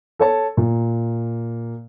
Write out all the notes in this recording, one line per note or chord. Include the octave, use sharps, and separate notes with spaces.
A4 C#5 A5
A#2